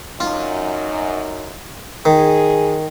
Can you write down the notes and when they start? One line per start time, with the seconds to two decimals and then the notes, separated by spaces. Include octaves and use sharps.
0.20 F#2 D#4 F4
2.05 D#3 G#4